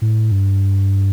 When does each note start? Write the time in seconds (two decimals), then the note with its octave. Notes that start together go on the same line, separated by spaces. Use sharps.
0.02 A2
0.32 G2